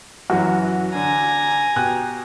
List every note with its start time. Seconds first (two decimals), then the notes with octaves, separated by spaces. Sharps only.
0.30 F#2 E3 F#3 F#4
0.95 D3 D4 G#5 A#5
1.76 B2 G4 F#6